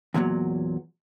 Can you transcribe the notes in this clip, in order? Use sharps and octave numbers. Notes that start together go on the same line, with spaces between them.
E2 A#2 E3 F#3